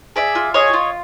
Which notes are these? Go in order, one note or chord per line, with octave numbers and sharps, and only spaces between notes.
G#4 D5 E5
F4
G#4 C#5 D#5
F4